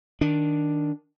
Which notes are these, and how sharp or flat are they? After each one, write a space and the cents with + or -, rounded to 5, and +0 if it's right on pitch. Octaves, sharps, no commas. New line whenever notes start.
D#3 +0 D4 +0